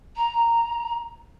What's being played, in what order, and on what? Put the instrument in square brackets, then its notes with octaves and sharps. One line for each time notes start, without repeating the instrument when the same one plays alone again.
[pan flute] A#5